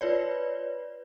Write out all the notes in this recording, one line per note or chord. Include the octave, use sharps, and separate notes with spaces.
F4 B4 C#5 D5